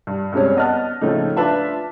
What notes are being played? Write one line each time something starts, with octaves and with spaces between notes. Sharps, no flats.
G2
G2 C3 G#3 C#4
B3 D#5 A5 F6
A2 C#3 F3 A3 D#4
D4 F4 B4 E5 A5